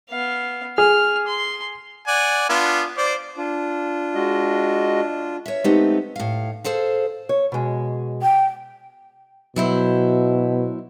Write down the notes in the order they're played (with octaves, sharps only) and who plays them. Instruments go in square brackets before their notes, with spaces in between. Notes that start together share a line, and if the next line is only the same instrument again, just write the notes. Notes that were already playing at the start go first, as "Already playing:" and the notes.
[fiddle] B3 F5
[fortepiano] G#4 [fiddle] F6
[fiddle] C6
[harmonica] D5 F#5 G#5
B3 D4 F4
C5 D5
[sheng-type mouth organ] D4 F4
[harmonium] G#3 F#4 D#5
[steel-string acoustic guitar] C#5 E5
G#3 A3 B3 C4 D#4 G4
A2 F5
G#4 A4 C5 F5
C#5
B2 G#3
[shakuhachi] G5
[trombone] B2 [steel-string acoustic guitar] F#3 E4 C5